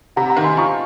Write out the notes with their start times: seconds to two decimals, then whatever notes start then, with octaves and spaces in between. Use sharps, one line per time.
0.16 C3 F#5 A#5
0.30 F#5 A#5
0.37 D#3
0.44 G#5 C6
0.57 F3 A#5 C#6